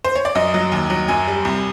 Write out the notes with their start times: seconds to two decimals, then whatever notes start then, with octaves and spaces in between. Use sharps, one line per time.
0.04 C5
0.15 C#5
0.25 D5
0.35 F#2 D#5
0.54 F#3
0.72 D#2
0.90 F#3
1.08 F#2 G#5
1.28 G3
1.45 C2